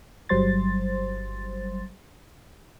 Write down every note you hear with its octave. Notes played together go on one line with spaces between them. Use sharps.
G1 F#3 G3 C5 C6 A6